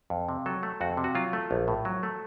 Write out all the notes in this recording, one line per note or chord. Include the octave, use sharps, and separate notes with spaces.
F2
C3
F#3 A4
A3
F2 F#4
C3
F#4
F#3 F4
A3
A#1
A2
F#3
A3